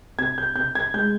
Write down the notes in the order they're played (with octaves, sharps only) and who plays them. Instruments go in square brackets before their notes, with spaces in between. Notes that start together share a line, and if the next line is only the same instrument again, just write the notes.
[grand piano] C3 G#6
G6
C3 G6
G#6
G#3 G6